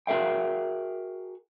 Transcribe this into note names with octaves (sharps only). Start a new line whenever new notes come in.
F#4 G#4 A#4 E5 G5